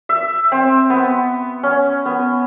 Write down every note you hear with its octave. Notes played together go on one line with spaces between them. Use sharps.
E5
C4
B3
C#4
B3